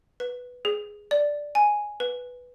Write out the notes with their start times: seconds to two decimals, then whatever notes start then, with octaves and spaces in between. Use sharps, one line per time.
0.20 B4
0.65 G#4
1.11 D5
1.55 G#5
2.00 B4